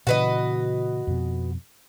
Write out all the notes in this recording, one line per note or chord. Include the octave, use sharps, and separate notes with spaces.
A#2 C#3 E3 F#4 B4 D#5
F2 B2